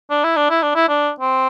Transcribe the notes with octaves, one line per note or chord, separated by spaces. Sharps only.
D4
E4
D4
E4
D4
E4
D4
C4